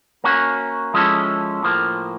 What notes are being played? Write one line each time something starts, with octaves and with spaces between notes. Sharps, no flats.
A#3 C#4 F#4
F3 G#3 C#4 E4 A4
A2 F3 A#3